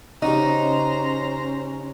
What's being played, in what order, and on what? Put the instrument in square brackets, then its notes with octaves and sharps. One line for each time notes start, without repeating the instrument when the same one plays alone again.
[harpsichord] C#3 G3 F#4 [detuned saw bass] C#4 [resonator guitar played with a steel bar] D#4 [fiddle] C5 A#5